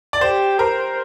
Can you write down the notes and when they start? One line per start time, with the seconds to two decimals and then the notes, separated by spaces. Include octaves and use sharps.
0.13 D5
0.21 G4 C5
0.59 A#4 C5